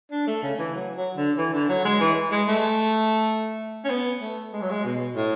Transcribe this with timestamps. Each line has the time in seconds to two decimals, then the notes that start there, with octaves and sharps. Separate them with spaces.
0.12 D4
0.27 A3
0.43 C#3
0.59 E3
0.74 F#3
0.95 F#3
1.16 D3
1.37 E3
1.53 D3
1.69 F#3
1.85 G#3
2.00 E3
2.32 G#3
2.48 A3
3.85 C#4
3.90 B3
4.21 A3
4.53 G#3
4.61 F#3
4.70 G#3
4.85 B2
5.16 A2